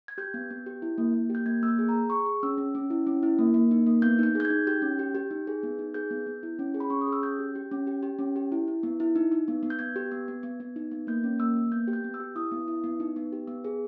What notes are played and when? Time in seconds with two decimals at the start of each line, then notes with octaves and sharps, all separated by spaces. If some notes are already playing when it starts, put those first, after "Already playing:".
0.08 G#6
0.18 G4 G6
0.34 B3
0.50 B3
0.66 G4
0.82 E4
0.98 A#3
1.14 A#3
1.30 G4
1.35 G6
1.46 A#3 G#6
1.63 A#3 E6
1.68 G6
1.79 G#4
1.89 A#5
1.94 G#4
2.10 G#4 C#6
2.26 G#4
2.43 C#4 E6
2.58 C#4
2.75 C#4
2.90 E4
3.07 C#4
3.23 E4
3.39 A#3
3.54 A#3
3.71 D#4
3.87 A#3
4.02 B3 G6
4.19 D#4 G6
4.35 G#4 G6
4.45 G#6
4.50 D#4
4.67 G4 G6
4.82 C#4
4.99 G4
5.15 G4
5.31 D#4
5.47 G#4
5.63 B3
5.79 D#4
5.94 G#4 G6
6.11 B3
6.27 B3
6.43 E4
6.59 C#4
6.74 G#4
6.80 B5
6.90 C#4 C#6
7.01 D#6
7.07 G#4
7.13 E6
7.23 C#4 G6
7.39 G4
7.55 G4
7.71 C#4
7.87 G4
8.03 G4
8.19 C#4
8.36 G4
8.52 E4
8.68 E4
8.83 B3
9.00 E4
9.16 D#4
9.32 D#4
9.48 B3
9.63 B3
9.70 G6
9.79 B3 G#6
9.96 G4
10.12 B3
10.28 B3
10.43 B3
10.60 B3
10.76 D#4
10.91 B3
11.07 A#3 G6
11.24 C#4
11.39 A#3 E6
11.56 A#3
11.72 B3 G6
11.88 G4
11.93 G6
12.04 B3
12.14 E6
12.20 G4
12.36 E4 D#6
12.52 B3
12.68 E4
12.84 B3
13.00 D#4
13.16 B3
13.33 G4
13.48 B3
13.64 G#4